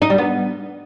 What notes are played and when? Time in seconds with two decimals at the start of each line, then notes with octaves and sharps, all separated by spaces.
0.02 D#4
0.10 G3
0.18 B3